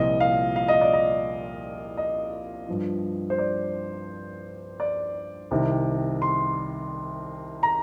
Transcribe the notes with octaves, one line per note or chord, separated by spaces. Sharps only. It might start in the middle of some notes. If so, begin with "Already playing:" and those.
Already playing: C2 A#2 F3 D#5
F5
F5
D#5
D5
D#5
D#5
G2 F3
C5
D5
D5
C2 C3 D#3
C6
A#5